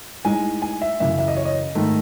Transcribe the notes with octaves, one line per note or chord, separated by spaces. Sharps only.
A2 G#3 D#4 G#5
G#5
E5
F#2 C#3 E3 E5
E5
D#5
C#5
D#5
G#2 D#3 A3